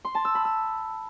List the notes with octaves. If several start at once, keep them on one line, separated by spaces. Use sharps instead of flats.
C6
A5
E6
B5
E6